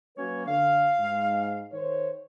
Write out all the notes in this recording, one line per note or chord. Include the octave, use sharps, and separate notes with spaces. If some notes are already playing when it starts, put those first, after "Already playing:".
F#3 A#3 C#4 B4 C#5
D3 F5
G#2
D#3 C5 C#5